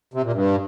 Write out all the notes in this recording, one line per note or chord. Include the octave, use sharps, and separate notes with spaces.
C3
A#2
G2